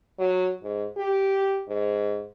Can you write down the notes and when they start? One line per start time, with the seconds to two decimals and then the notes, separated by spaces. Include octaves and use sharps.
0.19 F#3
0.63 G#2
0.97 G4
1.68 G#2